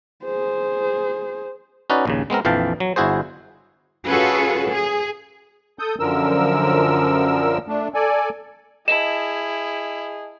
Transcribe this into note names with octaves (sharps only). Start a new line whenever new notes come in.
G#4 C5
C#4 D#4 F#4 B4 D5
A#1 D#2 C#3
G#3 B3 C4 A#4
A#1 F2 E3 F5 G5 A5
F#3
G1 E4 F#4 G#4 C5
C#4 F4 F#4 G#4 A4 B4
G#4
A4 D#6 G6
F#2 D3 F3 A#4 E6
A3 D4
A4 D5 G#5
E4 G#4 D#5 A5 E7